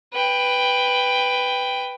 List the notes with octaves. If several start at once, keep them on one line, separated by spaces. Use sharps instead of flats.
B4 G5